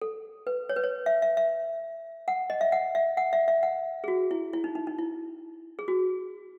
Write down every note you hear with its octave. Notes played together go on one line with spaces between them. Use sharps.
A4
B4
C#5
B4
C#5
E5
E5
E5
F#5
D#5
E5
F#5
E5
F#5
E5
E5
F#5
G#4
F#4
E4
E4
D#4
D#4
D#4
E4
G#4
F#4